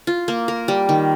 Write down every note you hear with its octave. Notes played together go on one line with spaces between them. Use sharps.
F4
A#3
A#4
G3
D#3